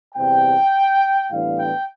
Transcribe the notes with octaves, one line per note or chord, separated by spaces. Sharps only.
E2 C3 G3 G5
A2 E3 G3 B3 D4 F5
G5